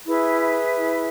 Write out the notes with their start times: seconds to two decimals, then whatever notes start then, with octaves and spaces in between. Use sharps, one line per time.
0.06 E4 G#4 B4 E5
0.77 E4